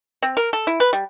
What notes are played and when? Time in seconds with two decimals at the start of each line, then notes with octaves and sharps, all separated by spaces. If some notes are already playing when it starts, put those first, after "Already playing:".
0.22 C4
0.37 A#4
0.53 A4
0.67 E4
0.80 B4
0.93 G3